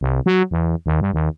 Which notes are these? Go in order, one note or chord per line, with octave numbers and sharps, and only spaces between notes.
C2
F#3
E2
D#2
G2
D#2